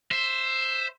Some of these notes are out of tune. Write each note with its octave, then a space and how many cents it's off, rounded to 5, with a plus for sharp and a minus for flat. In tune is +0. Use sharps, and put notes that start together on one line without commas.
C5 +0 E5 +10